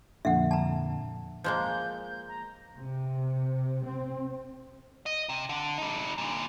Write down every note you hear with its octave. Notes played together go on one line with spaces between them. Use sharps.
F2 A#2 D3 E5 F#5
A5 A#5
F3 G#3 A#3 G6
G6
A#5
C3
C4
D#5
C3
D3
G3 D#4
A#2 D3